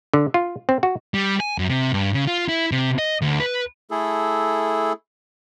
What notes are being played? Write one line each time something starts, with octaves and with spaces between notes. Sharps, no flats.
D3
F4
C4
F#4
G3
G#5
F#2
C3
G2
C#3
F4
E4
C3
D#5
D2
B4
A3 E4 G#4 A4